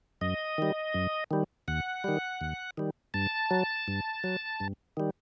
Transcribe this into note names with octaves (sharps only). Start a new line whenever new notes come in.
F#2 D#5
D#3 G3
F#2
D#3 G3
D#2 F#5
D#3 G3
D#2
D#3 G3
G2 A5
F#3
G2
F#3
G2
D#3 G3